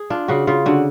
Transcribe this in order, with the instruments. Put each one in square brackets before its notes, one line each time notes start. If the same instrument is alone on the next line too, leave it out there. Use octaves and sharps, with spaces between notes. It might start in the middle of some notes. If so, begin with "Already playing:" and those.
Already playing: [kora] G#4
D4 F4
C#3 F#4
C#3 F4
D3 F#4